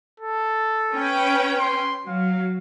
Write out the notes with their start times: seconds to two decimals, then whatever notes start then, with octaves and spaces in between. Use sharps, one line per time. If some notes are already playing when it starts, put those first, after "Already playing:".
0.20 A4
0.94 C#4 B4 G5
1.59 C6
2.08 F#3 F5